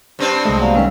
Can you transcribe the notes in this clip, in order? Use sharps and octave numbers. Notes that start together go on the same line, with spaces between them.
G2 C4 D4
C2 G#3 A3 D#5
F#3 A#3 D5 F5
G#2 D#3 G3 C#4 B4 E6